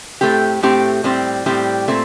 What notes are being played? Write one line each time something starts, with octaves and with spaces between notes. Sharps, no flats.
A2 A3 C4 G4
A2 A3 C4 G4
A2 G3 C4 G4
A2 G3 C4 G4
A#2 A3 C4